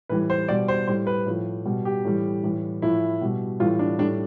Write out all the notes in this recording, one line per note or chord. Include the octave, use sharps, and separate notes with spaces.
A2 E3 G3 B4
C5
B2 G3 D5
C5
A2 G3 C5
B4
A2 F3
B2 G3
G4
A2 E3 G3
A2 E3 G3
A2 F3 E4
B2 G3
A2 E3 G3 F4
D4
A2 G3 D4